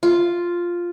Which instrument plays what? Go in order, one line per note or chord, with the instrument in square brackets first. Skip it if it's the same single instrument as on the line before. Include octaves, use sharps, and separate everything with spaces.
[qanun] F4